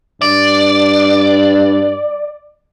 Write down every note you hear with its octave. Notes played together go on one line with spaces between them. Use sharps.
G2 D5